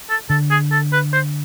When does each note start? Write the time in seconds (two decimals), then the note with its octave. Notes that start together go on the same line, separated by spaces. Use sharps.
0.10 A4
0.30 D3 A4
0.51 G#4
0.72 A4
0.93 B4
1.13 C5